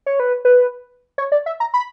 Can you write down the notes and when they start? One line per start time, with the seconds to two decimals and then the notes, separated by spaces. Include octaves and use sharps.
0.06 C#5
0.20 B4
0.45 B4
1.18 C#5
1.32 D5
1.46 E5
1.60 A#5
1.74 B5